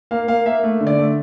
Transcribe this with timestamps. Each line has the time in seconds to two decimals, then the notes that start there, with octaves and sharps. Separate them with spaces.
0.11 A#3 F5
0.28 A#3 F5
0.46 A#3 E5
0.63 A3
0.81 D3
0.87 D5
0.98 A3